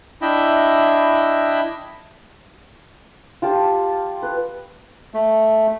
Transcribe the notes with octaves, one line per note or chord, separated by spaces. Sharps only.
D4 E4 D#5 E5 G5 B5
F4 G4 A5
B4
A3